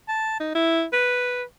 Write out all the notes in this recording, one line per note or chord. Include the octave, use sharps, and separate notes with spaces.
A5
D#4
E4
B4